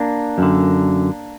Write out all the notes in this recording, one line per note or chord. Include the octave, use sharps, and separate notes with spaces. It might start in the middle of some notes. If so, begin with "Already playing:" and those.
Already playing: A#3 D4
F#2 D3